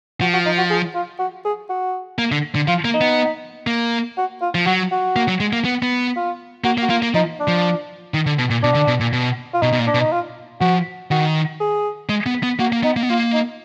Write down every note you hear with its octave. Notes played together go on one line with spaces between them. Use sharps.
F3 F#4
F#4
D#4
F#4
G#4
F4
F#4
G#4
F#4
A#3
D3
D3
F3 F4
A#3
D#4
B3
A#3
F#4
F4
F3
F#3 F#4
F#4
A#3
F#3
G#3
A#3
B3
B3
F4
A#3 F#4
A#3
F#4
A#3 F4
A#3
F3 D#4
D4
F3
D#3
D3
B2
A#2
B2 D4
D3
B2
A#2
B2
F4
B2 D#4
B2
A#2
D4
B2
D#4
F4
F3 F#4
D#3 F#4
G#4
G#3
B3
B3
A#3 F#4
A#3
B3 D#4
A#3
B3
A#3 F4
D#4